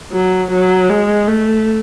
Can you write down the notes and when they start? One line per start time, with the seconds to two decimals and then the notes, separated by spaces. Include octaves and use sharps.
0.12 F#3
0.50 F#3
0.89 G#3
1.28 A3